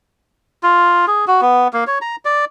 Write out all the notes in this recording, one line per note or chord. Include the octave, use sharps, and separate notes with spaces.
F4
G#4
F#4
B3
A#3
C#5
A#5
D5